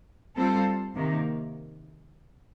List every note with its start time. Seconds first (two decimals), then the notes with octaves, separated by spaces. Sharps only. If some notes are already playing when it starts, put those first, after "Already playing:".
0.36 G3 C4 F4 A4 C5
0.94 C3 D#3 A#3